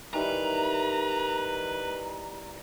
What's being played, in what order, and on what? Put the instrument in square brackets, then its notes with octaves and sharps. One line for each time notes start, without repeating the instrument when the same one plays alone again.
[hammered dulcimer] D#3 E3 G3 [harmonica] B4 [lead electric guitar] A#5